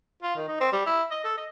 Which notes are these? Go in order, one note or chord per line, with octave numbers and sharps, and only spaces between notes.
F4
D#3
D#4
C4
G3
E4
D#5
A4
D#5